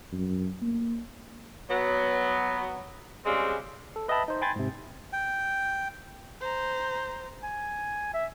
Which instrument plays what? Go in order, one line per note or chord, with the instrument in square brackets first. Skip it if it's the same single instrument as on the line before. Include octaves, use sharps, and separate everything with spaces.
[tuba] F#2
A#3
[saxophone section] F#3 B3
C#3 G3 G#3 C4
[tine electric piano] A4
B4 D#5 E5 G5 A5 B5
D#4 C5
G5 G#5 B5 C6 G#6 A6
G#2 C3
[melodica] G5
[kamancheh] C5 A#5
[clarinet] G#5
E5